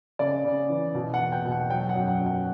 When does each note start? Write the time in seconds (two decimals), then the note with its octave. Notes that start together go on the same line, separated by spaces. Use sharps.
0.19 C#3 D5
0.45 C#3
0.69 E3
0.95 B2
1.14 F#5
1.20 E2
1.32 G5
1.45 B2
1.52 F#5
1.70 F#3 G5
1.89 F#5
1.95 F#2
2.08 F#5
2.20 F#3
2.26 F#5